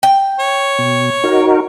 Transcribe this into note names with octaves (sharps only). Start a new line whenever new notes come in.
G5
C#5
B2
D#4 F#4 A#4